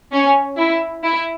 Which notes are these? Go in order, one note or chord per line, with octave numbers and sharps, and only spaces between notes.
C#4
E4
E4